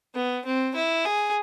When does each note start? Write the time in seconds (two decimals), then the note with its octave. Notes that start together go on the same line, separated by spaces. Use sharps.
0.15 B3
0.46 C4
0.75 E4
1.05 G#4